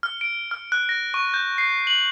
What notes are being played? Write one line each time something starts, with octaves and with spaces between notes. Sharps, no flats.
F6
D7
F6
F#6
A#6
C#6
G6
C7
F#7